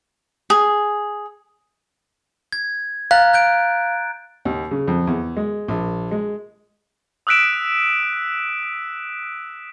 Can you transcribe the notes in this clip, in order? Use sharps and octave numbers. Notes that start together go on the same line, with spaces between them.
G#4
G#6
F5 A#5 F#6 A6
F#6 G6 D7
D#2
C#3
F2
E2
G#3
A#1
G#3
D#6 E6 F#6 B6 D7 E7